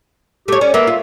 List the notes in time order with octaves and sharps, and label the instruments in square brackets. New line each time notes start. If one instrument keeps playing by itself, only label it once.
[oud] A3 C#5 [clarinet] G4
[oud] C#4 [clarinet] D5
[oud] A#3 B3 [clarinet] E5
[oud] F4